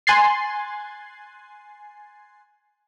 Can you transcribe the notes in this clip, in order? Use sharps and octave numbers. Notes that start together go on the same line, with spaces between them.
G#5 C6 F#6 G#6 A6 C7